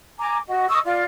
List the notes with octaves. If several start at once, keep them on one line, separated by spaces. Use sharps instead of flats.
G#5 A#5 D6
F#4 D#5
D#5 C#6 D#6 E6
F4 D5